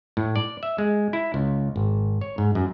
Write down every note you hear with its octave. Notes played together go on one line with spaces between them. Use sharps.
A2
D5
E5
G#3
E4
C#2
G#1
C#5
G#2
F#2